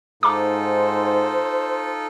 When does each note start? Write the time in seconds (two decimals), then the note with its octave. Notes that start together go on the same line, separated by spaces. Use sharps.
0.23 G#2 D#4 F4 A4 C5 A#5 D6